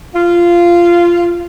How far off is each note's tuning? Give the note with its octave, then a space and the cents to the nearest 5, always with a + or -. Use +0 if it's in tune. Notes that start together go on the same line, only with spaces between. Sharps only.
F4 -15